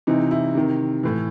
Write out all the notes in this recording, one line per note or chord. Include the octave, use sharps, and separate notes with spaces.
C3 E3 D#4
E4
C3 D#3
A2 E3